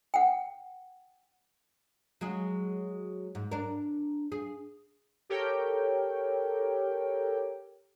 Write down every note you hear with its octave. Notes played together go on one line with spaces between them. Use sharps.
F#5 G5
F#3 G#3 G#4
G#2
D4 A#4
G#4
G4 A4 A#4 C#5 G5